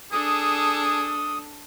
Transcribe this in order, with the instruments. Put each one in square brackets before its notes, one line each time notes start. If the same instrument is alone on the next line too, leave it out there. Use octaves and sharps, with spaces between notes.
[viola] D4 A4 [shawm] G#4 [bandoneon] D#6